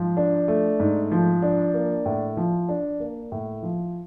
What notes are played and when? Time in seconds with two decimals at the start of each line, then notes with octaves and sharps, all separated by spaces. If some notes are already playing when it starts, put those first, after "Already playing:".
Already playing: G#2 F3
0.17 D4
0.48 A3
0.80 G#2
1.12 F3
1.42 D4
1.74 A#3
2.06 A2
2.37 F3
2.69 D4
3.00 A#3
3.32 A2
3.63 F3